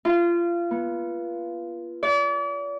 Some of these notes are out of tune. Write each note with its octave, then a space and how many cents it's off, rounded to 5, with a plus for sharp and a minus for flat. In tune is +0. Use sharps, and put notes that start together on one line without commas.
F4 -25
B3 -25
D5 -40